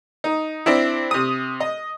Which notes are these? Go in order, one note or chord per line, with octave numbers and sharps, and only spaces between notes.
D#4
C4 D4 E4
C3 D#6
D#5